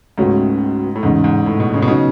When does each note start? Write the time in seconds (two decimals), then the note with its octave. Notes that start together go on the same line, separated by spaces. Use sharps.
0.18 C#2 G#2 B2 A3 C#4
0.96 A2
1.03 E2 G#2 C#3 G#3 D#4
1.24 G#2
1.46 A2
1.60 B2
1.74 C#3
1.82 B2
1.88 C#3 F#3 B3 D#4